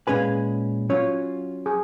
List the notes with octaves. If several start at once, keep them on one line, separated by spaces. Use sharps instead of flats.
A#2 G#3 C#4 G#4 B4 G#5
F#3 C#4 F4 C#5
G#4